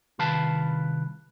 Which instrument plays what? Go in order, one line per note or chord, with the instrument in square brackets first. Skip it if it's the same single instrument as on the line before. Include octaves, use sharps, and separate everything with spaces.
[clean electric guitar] C2 D#3 B4 F5 A5